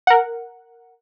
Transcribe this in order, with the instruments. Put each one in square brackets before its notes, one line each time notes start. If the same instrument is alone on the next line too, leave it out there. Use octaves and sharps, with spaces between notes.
[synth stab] A#4 F#5